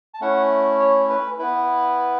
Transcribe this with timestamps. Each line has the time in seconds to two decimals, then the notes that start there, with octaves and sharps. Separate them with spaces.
0.14 A5
0.21 A3 C#4 E4 F#5
0.80 C#5
1.09 B4
1.39 B3 E4 B4